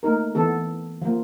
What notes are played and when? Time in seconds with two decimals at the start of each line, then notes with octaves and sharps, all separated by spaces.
0.03 A3 A#3 D#4 A#4
0.35 E3 B3 A4
1.02 F3 A#3